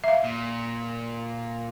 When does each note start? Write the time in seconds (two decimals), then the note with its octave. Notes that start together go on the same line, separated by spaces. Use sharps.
0.04 E5 F5
0.24 A#2